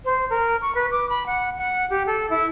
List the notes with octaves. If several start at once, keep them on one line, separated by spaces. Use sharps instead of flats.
C5
A#4
C#6
B4
D6
B5
F#5
F#5
G4
A4
E4